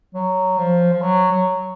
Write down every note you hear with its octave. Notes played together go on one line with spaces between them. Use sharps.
F#3
F3
F3
F#3
F#3